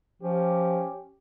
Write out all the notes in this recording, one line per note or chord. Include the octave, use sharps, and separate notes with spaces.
F3 C#4 G4